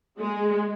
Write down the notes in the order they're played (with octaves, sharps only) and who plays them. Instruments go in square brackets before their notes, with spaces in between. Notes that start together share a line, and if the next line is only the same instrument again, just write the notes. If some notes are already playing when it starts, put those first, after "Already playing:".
[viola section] G#3